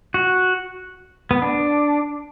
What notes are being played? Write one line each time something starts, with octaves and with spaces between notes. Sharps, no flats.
F#4
B3
D4